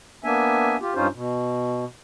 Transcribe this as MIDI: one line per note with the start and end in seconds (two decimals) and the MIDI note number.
0.24 0.77 58
0.24 0.77 59
0.24 0.77 62
0.24 0.77 76
0.24 0.77 80
0.81 0.94 65
0.81 0.94 67
0.95 1.07 43
0.95 1.07 61
0.95 1.07 63
0.95 1.07 65
0.95 1.07 72
1.14 1.85 47